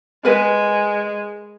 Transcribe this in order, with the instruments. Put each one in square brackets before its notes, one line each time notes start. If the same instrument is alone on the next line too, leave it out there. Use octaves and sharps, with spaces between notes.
[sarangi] G#3 [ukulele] A#4 B4 G#5